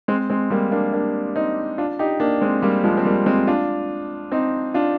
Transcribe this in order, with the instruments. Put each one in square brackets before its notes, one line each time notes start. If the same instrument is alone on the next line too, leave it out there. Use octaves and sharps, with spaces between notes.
[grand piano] G#3 C4
G#3 C4
G3 A#3
A#3 D4
A#3 D4
C4 D#4
D4 F4
D#4 G4
A#3 D4
G#3 C4
G3 A#3
F3 G#3
C4
G3 A#3
G#3 C4
D4 F4
C4 D#4
D4 F4